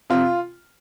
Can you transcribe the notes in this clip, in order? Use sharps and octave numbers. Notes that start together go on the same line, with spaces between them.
C3 F4